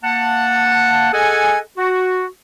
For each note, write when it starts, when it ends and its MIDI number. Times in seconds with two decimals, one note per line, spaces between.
0.03 1.12 58
0.03 1.12 78
0.03 1.12 81
1.13 1.59 68
1.13 1.59 69
1.13 1.59 75
1.13 1.59 78
1.13 1.59 80
1.77 2.26 66